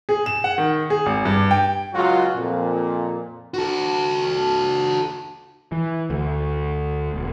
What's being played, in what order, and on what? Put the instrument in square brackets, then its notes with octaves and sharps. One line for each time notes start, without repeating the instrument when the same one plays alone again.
[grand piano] G#4
E7
F#5
D#3
G#4
G#1
G2
G5
[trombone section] C#2 F#3 F4 F#4
F2 A#2
[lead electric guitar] F#4 A4
[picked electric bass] E3
D2
E1